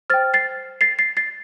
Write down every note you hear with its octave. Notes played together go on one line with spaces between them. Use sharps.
C5 G5 F6 A6
A6 C7
A6 C7
A6 C7
A6 C7